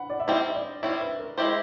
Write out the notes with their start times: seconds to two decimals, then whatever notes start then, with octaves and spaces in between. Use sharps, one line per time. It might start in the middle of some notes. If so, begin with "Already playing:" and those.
Already playing: F#5 B5
0.10 D5
0.20 E5
0.28 G3 C4 E4 D#5
0.55 D5
0.83 G3 C4 E4 C#5
1.01 B4
1.19 A#4
1.38 G#3 C4 E4 G4 C5